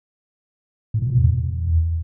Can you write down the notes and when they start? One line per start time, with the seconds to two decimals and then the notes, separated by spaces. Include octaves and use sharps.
0.94 A2
1.02 A#2
1.10 B2
1.18 E2